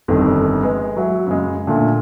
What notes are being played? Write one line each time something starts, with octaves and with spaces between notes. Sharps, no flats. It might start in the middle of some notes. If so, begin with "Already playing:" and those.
G1 F2 D#3
G#3 B3
F#3 E5
F#2 C#3 G#3
A#2 D3 A3 D4